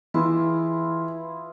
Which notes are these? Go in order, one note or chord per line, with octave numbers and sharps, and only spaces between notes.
E3 E4 F4 G#4 B4 E5